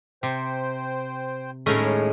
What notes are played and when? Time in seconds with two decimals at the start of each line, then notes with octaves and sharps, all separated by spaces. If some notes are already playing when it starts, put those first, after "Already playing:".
0.23 C3 C5 G5
1.66 D#2 A2 G#3 A3 C#4 A#4